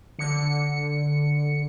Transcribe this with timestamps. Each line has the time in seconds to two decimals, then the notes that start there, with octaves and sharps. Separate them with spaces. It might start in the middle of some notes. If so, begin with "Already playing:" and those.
0.19 D3 C#7